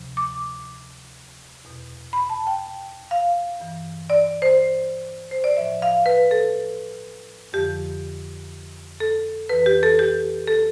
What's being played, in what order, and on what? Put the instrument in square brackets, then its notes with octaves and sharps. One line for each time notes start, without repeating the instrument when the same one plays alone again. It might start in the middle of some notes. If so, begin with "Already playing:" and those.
Already playing: [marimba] D2 C3 F3
D6
E2 B2
B5
A5
G5
F5
G2 E3
D5
C5
C5
D5
A2 F3 E5
F5
B4
A4
F2 D3 F3 G4
A4
F2 E3 B4
G4
A4
G4
A4